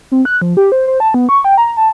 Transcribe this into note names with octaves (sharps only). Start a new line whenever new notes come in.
C4
F#6
F3
G4
C5
C5
A5
B3
C#6
G5
A#5
A5